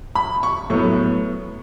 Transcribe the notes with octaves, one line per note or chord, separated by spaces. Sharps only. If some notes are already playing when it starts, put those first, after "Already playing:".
B5
C#6
A2 F#3 B3 C#6